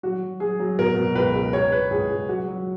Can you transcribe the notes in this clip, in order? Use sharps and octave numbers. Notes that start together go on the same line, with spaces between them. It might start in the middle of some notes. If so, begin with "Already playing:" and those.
F#3 F#4
F#3
F#3 G#4
F#3
B2 A#4
B2
C#2 B4
C#2
C#2 C#5
C#2 B4
C#2 G#4
C#2
F#3 F#4
F#3